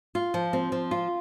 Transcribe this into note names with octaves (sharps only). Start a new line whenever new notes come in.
F4
F3
C4
F3
F4